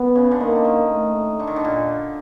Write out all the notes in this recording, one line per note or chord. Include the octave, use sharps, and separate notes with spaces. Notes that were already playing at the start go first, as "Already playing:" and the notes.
Already playing: B3
C#3
D3
D#3 A#3
D3
D#3
A3
D3
D#3
D3
A#2